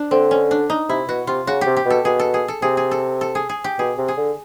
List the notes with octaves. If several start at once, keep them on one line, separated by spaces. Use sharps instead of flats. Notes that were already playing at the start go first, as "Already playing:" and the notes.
Already playing: D4
D3 C4
C#4
D4
D#4
C3 E4
B2 F#4
C3 F4
C#3 F#4
C3 G4
G4
B2 A4
B2 G#4
A4
G#4
A4
C3 G#4
G#4
A4
A4
G#4
G#4
G4
B2 G#4
C3
G#4
D3